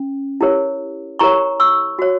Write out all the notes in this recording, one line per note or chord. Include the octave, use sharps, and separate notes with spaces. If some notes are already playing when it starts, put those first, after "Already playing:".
Already playing: C#4
E4 G4 A#4 C#5
E4 G4 A#4 C#5 A#5 C#6
C#6 E6
F#4 C#5